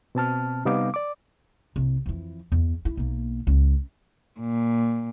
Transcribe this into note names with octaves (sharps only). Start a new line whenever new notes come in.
B2 C4 A5 F6
C3 G3 B3 D#4 F5 D6
D5 D6
C2
F2 E3
E2
E4
B1 A#3
C#2
A#2